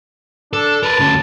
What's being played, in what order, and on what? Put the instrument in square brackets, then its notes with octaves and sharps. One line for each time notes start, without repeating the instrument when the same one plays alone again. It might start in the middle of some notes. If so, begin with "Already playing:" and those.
[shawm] D4 [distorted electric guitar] A4
[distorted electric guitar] A#4 B4 [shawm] A5
[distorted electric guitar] D2 C#4